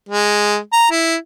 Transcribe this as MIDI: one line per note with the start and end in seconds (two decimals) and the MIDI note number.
0.09 0.57 56
0.72 0.88 82
0.91 1.15 64